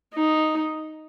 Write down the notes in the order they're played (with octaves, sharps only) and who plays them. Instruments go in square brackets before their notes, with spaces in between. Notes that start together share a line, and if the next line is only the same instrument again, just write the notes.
[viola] D#4